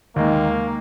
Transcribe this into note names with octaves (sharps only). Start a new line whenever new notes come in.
D#2 D#3 G#3 A#3